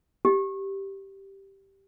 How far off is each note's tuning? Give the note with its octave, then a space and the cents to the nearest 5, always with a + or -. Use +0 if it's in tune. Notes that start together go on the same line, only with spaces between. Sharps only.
G4 -5